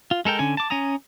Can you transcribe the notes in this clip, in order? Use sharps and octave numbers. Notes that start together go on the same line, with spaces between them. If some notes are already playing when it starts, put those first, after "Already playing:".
F4
G#3 A4 A#4 G5
D3 C#4 G#5
A5 D6
C#4 G#5 A#5 D#6